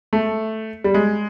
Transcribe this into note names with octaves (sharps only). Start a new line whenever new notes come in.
A3
G3
G#3